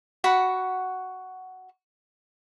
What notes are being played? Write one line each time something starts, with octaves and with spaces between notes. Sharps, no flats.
F#4 F#5 B5